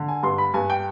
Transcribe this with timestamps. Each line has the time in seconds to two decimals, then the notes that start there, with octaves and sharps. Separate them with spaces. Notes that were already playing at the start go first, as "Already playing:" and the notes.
Already playing: D3
0.08 G#5
0.23 G2 C6
0.38 B5
0.54 G2 G#5
0.70 G5